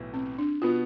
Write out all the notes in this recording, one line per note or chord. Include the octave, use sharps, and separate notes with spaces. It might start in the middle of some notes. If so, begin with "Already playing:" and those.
Already playing: B1 A2 E3 B3 E4
C4
D4
B2 B3 F4